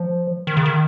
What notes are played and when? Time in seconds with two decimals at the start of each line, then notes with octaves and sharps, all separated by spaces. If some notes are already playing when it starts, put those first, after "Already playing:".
Already playing: F3
0.47 D#3
0.57 C#3
0.66 D#3